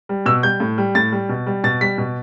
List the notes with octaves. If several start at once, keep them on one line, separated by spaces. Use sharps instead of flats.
G3
B2 E6
G3 G6
A2
G3
A2 A6
G3
B2
G3
B2 A6
G3 B6
B2